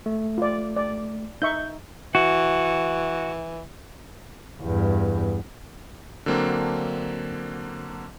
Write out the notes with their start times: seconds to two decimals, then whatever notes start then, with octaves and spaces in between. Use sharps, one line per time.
0.06 A3
0.38 F4 D5
0.76 D5
1.42 D#4 E5 C#6 G6
2.15 E3 F#4
4.62 E2 G2
6.26 D3 F#3 A#3 C4 D4